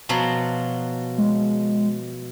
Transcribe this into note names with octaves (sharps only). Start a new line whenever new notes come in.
B2 F3 F#3
G#3